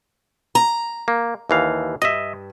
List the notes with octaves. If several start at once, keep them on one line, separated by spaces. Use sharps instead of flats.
A#5
A#3
D#2 E3 F5
G2 D#5 E5